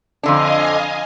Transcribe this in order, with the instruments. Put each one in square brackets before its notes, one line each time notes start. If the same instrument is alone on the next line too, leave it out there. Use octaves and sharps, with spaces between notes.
[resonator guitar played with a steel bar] F2 D3 D4 [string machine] D#5 F5 G#5